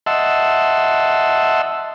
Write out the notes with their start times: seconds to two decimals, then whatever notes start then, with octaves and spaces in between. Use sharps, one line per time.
0.06 D#5 E5 F#5 A5 C6 E6